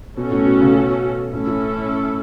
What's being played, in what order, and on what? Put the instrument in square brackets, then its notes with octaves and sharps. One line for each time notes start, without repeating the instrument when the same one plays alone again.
[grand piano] B2 [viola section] C#4 F#4 A4
[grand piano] A2
B2
C#3
B2
[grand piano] A2 [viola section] C#4 E4 A4
[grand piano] E3